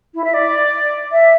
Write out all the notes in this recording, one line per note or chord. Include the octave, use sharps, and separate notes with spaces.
E4
E5
D5
E5